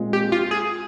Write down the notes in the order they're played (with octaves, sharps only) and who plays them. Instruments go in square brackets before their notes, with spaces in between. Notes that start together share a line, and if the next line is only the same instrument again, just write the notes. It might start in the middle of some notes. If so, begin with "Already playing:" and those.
Already playing: [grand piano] A#2 G#3 C4 F4
[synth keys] G4
F4
G#4